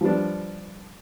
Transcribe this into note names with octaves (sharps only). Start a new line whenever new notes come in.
F3 G3 B3 D4